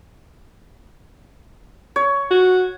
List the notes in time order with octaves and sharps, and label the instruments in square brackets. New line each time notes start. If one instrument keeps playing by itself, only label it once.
[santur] C#5
[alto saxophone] F#4